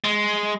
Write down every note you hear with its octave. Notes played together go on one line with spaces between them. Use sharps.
G#3